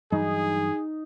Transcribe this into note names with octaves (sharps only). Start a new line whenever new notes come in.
G2 E3 F#3 D#4 G#4